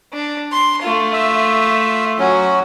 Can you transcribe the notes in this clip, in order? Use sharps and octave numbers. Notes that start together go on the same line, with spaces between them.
D4
C6
A3 F4
E5
F#3 C#4 F#4